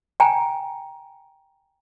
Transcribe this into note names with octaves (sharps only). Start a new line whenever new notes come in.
G5 G#5 A#5